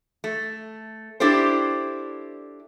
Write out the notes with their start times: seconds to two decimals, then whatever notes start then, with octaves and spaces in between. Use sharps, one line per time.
0.24 A3
1.20 D4 E4 G4 A4 C5